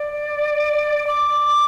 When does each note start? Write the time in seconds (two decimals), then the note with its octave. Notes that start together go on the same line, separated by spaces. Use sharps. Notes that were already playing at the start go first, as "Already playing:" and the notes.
Already playing: D5
1.07 D6